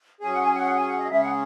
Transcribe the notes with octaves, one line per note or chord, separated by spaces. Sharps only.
F#3 C#4 G#4 G#5
F#5
G#5
F#5
F#5
G#5
F#5
D#5
C#3 G#3 C#4 G#4 E5
F#5